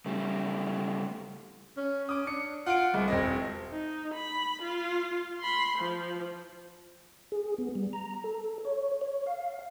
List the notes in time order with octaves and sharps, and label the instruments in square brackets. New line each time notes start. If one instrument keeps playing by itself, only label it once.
[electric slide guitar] C#3 G3 A3
[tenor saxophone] C#4
[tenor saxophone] C#4 [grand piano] D6 D#6
[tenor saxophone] D4 [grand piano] C#7
[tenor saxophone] F4 [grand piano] F#5 D7
[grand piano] C2 [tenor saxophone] G#3
[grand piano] E1 C4 D#5
[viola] D#4
B5
F4
B5 C6
F3
[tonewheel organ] G#4
B3
G3
A#5
A4
C#5
C#5
F5